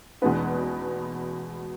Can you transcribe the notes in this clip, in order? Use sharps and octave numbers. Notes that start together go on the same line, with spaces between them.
E2 B2 G#3 B3 D#4 B4